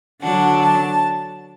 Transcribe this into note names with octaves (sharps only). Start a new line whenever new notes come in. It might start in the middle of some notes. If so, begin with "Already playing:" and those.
D3 F#3 D4 F#5
A5